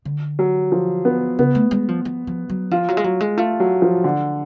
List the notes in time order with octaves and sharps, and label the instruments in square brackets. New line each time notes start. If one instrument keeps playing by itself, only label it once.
[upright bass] D3
[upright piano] F#3
F3
B3
[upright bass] C#3 [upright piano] B3
[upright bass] A3
G#3
F3
F3
F3
F#3
[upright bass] F3 [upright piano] F4
[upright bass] F#3
G#3
F#3
G#3
[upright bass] A3 [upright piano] F4
[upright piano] F#3
F3
D3